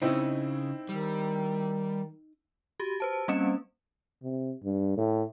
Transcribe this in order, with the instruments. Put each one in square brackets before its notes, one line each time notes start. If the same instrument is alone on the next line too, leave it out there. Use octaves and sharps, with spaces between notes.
[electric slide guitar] C#3 [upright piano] C4 E4 [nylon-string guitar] D#4 D#5
[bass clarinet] D#3 [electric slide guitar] G3
[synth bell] F#4 G4
B4 C5 A5
G3 A#3 C4 C#4 C#7 E7
[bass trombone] C3
G2
A2